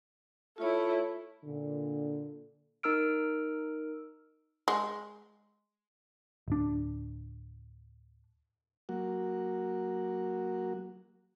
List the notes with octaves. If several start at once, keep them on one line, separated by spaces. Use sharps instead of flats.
A3 E4 F4 C#5
A#2 D3
D#4 A#4 E6 F6 D7
G#3
D1 D4
F#3 A#3 F#4